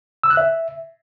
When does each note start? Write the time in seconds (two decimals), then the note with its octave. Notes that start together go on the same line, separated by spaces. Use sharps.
0.24 E6
0.30 F#6
0.37 E5